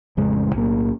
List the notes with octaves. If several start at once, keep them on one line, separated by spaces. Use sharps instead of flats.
A1 F2 C#3 G#3
B1 A2 A#3